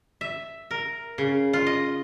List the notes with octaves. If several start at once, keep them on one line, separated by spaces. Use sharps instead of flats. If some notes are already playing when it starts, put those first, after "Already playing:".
E5
A#4
C#3
F4
D#5